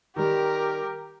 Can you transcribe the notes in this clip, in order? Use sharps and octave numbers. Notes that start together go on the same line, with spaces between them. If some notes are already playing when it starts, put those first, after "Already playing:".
D#3 G3 G4 A#4